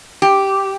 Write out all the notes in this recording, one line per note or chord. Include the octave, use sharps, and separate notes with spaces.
G4